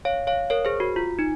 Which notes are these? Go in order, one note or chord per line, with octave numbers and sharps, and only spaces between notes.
C#5 F5
C#5 F5
A#4 C#5
G#4 C5
F#4
F4
D#4